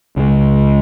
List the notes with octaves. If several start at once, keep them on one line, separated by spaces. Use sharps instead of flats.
C#2 C#3 E3 G#3